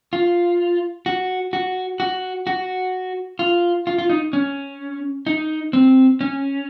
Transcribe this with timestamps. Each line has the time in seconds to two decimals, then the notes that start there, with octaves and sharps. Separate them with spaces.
0.13 F4
1.06 F#4
1.53 F#4
2.00 F#4
2.47 F#4
3.39 F4
3.87 F4
3.98 F4
4.09 D#4
4.33 C#4
5.27 D#4
5.73 C4
6.21 C#4